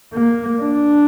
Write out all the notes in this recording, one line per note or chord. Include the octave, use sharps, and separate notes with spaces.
A#3
D4